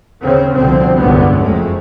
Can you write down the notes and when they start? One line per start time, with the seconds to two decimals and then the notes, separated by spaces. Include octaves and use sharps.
0.21 D#2 C#3 C4
0.54 C2 B2 D3 F3 C4
0.97 F1 C#2 G2 D3 B3
1.40 F#1 F2 G#3 A3